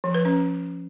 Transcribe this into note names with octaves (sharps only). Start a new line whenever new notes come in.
F3
B4
C#4